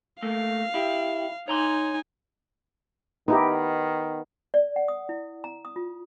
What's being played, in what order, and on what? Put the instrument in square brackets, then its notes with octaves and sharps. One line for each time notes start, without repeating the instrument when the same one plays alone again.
[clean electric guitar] A3 A#3 [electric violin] F5
[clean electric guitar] E4 G4
[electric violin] D#4 G#5 [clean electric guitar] C#5 A#5 C6
[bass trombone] D#3 [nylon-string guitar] B3 [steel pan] D#4 E4 G4
[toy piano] D5
F#5
D#6
E4
A#5
D#6
F4